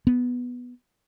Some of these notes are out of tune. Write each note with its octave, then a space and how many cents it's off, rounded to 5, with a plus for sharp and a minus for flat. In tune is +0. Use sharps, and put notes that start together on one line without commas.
B3 -5